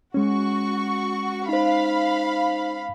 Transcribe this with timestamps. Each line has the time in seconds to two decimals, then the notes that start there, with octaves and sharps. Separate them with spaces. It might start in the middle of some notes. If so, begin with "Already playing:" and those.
0.14 G#3 C#4 F#4 C#6
1.49 D#4 C5 F5 B5